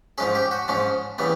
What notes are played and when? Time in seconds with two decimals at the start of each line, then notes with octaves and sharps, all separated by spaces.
0.18 G#2 F3 G#3 C#4 G#4
0.35 G4
0.51 F#4
0.68 G#2 F3 G#3 C#4
1.18 C#3 E3 G3 B3